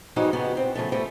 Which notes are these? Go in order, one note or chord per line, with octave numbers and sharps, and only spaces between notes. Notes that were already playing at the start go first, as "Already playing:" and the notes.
E3 F3 G3 G#3 D#4 F#4
C#3 B3 F#4 G4
C4
C#3 F3 A3
G3 A3 C4